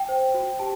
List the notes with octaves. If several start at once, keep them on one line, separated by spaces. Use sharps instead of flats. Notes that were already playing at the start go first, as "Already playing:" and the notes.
Already playing: G5
C5
F#4
G4 A5